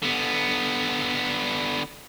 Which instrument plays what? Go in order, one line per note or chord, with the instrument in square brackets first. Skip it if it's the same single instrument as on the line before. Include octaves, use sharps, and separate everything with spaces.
[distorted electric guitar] D3 B3